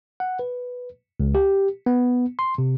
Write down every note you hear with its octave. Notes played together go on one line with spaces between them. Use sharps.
F#5
B4
C#2
G4
B3
C6
C3